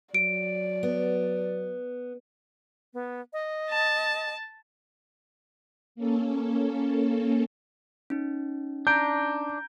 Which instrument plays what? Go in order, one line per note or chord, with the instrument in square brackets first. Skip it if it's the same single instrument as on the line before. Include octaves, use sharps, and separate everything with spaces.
[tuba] F#3 [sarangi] D5 [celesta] D7
[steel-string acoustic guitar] B3
[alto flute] B3
D#5
[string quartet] A5
[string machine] A#3 C#4 A4
[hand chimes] C#4 D#4
[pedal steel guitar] D4 [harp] A#5 [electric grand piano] G6 D7